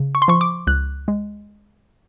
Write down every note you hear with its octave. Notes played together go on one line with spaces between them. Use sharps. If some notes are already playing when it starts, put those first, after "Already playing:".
Already playing: C#3
C#6
C6
F3 C#6
D6
C#2 F#6
G#3